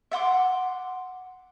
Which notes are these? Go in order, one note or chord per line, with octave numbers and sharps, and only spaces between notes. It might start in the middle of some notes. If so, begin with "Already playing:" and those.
E5 F#5 C6 D6